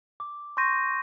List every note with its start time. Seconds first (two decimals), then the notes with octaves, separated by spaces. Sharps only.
0.20 D6
0.57 C6 C#6 G6 A#6 D#7